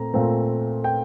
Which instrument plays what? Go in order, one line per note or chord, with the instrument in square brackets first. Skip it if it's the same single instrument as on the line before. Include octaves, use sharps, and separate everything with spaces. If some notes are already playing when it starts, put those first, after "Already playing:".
Already playing: [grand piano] A#2 A3 C4 A#5
A#2 A3 C4
G5